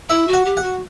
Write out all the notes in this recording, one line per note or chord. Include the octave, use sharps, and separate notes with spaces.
E4 E5
F#4
F#5
G4
F#5
F#4